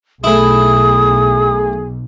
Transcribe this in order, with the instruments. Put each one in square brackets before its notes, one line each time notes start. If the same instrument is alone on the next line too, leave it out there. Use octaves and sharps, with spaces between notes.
[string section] B1 [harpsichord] A3 E4 [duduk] G#4 [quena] D#6